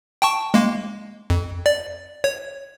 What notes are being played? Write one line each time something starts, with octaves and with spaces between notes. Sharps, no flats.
G5 A5 C#6
G#3 A#3
F2
D5
C#5